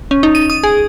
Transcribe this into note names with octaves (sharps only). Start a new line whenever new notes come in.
C#4
D#4
D#7
D#6
G#4